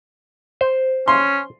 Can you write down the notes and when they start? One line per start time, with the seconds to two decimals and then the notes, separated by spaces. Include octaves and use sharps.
0.61 C5
1.08 C#4 C6